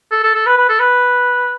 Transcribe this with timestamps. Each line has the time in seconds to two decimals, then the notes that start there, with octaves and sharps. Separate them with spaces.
0.12 A4
0.23 A4
0.35 A4
0.46 B4
0.58 B4
0.69 A4
0.80 B4